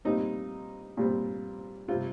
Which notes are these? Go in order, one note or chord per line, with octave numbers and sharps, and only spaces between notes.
A#2 G3 C4 D#4
A#2 G3 C4
C3 G3 C4 F4